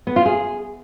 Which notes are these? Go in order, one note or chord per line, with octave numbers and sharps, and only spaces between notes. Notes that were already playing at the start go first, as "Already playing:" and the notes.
B3
F4
G#4